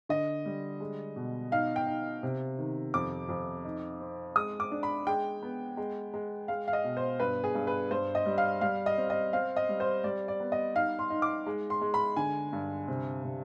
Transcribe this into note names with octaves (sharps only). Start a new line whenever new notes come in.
D3 D#5
G3
G#3
B2
D#4 F5
G5
D#4
C3
D#3
F2 D6
F2
D#4
C4
G#3 D#6
D6
D4
B5
G#3 G5
B3
G#3
G#3
G#3 F5
F5
D#5
B2
C5
G2 B4
G#4
G2
B4
G2 C5
D#5
G3
F5
G3 F5
D#5
C4
D#5
C4 F5
D#5
G3
C5
G3 D5
D5
B3
D#5
D#4 F5
C6
D#4
D6
G#3
C6
G#3
B5
D3 G#5
G2
C3
C3